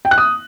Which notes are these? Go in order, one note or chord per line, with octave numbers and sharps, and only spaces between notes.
G5
F#6
D#6